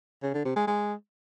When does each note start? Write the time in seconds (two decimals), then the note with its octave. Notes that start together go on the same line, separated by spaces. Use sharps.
0.23 C#3
0.34 D3
0.45 C3
0.56 G#3
0.67 G#3